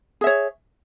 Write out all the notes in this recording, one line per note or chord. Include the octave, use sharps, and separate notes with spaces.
G#4 C#5 E5